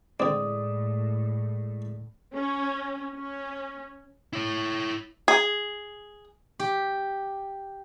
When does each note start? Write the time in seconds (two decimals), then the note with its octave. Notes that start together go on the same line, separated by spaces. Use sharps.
0.20 A2 D3 G#3 C4 D5 D#6
2.34 C#4
3.15 C#4
4.33 E4 C#5
5.28 G#4
6.60 G4